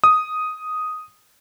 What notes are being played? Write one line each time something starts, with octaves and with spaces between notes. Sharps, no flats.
D#6